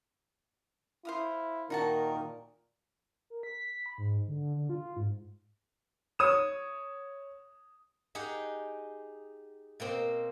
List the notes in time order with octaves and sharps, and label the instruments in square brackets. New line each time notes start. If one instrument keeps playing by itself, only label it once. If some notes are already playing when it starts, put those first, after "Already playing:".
[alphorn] E4 [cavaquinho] C5 F5 D#6
[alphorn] A#2 [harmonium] D#3 A#4 [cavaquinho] D#4 F#4 A5
[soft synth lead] A#4
B6
B5
G#2
D3
D3
F4
G#2
[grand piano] C#5 D#6 E7
[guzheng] D#4 G4 G#4 F#5
B2 A#3 C4